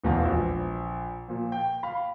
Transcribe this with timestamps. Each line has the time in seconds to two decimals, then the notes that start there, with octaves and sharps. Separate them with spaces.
0.04 E1 E2 G#2 B2 F5
0.25 A#1
1.28 A#2 F3
1.52 G5
1.83 F5 B5